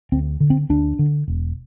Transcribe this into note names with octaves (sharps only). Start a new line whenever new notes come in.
D2 C4
D3
C4
D2 D4
D3
E1